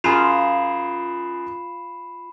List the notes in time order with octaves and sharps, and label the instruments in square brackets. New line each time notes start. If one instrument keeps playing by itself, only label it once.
[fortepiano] F#2 G#4 [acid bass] F4 [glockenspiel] B5 C7 E7